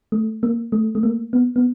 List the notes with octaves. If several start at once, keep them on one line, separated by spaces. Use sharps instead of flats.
A3
A#3
A3
A3
A#3
B3
B3